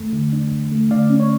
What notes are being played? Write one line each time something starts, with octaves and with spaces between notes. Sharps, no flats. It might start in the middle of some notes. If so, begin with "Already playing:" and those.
Already playing: E2 A3
D3
D4
E2
A3
D3 D5 F5
C#4
C#5